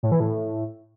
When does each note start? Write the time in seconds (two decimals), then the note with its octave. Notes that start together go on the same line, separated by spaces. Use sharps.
0.03 A2
0.12 E3
0.20 A2